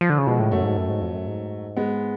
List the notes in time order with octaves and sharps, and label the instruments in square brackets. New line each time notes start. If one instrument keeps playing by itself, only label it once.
[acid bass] F3
D3
C#3
[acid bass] B2 [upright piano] F3 G#3
[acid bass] A2
[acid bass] F#2 [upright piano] F#3 A3
[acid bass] G#2
F#2
G#2
F2
F#2
G#2
[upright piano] G#3 B3